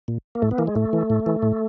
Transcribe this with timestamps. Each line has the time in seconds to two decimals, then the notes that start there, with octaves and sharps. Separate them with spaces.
0.08 A#2
0.35 A#3
0.42 A2 A3
0.51 B3
0.58 E3 A#3
0.67 G#3
0.75 A2 A3
0.93 E3
1.10 A2
1.26 E3
1.42 A2